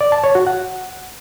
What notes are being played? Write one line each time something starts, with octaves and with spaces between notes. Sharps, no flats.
D5
A5
C#5
F#4
F#5